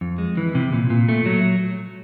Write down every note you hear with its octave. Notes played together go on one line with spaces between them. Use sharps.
F2
G#3
E3
C3
A#2
A#2
A3
F#3